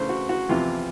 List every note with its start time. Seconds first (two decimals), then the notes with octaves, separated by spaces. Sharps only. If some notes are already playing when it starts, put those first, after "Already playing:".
Already playing: C#3 E3 A3 D4 C5
0.09 F#4
0.29 F#4
0.49 E2 C3 F3 F4